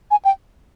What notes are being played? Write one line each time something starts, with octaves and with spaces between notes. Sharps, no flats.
G#5
G5